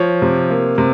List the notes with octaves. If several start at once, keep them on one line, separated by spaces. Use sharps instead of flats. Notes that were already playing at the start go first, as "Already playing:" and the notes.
Already playing: F3 C#5
C3
A#3
C3